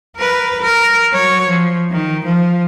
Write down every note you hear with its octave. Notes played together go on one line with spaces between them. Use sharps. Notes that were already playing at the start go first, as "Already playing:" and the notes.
A#4 B4
A#4
F#3 C#5
F3
D#3
F3